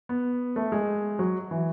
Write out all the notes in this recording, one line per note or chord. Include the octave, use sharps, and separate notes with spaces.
B3
A3
G#3
F#3
E3